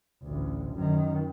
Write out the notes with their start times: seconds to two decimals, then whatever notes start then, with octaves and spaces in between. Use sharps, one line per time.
0.23 A1 D2
0.74 F#2 D#3